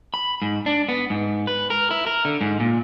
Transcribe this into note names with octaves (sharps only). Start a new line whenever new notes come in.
B5
G#2
D4
B3
G#2
B4
A#4
E4
A#4
D3
G#2
A#2